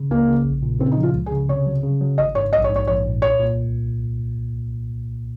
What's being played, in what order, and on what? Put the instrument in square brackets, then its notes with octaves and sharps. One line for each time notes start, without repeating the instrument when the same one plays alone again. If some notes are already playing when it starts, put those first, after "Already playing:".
Already playing: [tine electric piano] C#3
[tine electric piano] C#2 [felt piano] A#3
[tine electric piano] C#3
A#1
A#2
[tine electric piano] C#3 [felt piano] C4
[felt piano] D#4
[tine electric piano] F3
[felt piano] F4
[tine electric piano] C#2
[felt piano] G#4
[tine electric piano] C#3
[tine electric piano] C3 [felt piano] C#5
[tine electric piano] F#3
C#3
F#3
[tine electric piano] G#1 [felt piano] D#5
[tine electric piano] G#2 [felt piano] C#5
[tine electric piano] A#1 [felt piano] D#5
[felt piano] C#5
[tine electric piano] G#2
[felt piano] C#5
[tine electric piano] A#1 [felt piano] C#5
[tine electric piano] A#2
[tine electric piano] C2 [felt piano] C#5
[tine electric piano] A#2